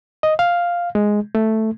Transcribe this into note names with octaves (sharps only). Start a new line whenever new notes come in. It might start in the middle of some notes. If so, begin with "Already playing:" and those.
D#5
F5
G#3
A3